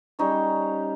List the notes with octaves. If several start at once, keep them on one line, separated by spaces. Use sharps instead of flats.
G3 C#4 D#4 C#5